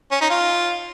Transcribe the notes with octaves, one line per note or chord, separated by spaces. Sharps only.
C#4
D#4
F4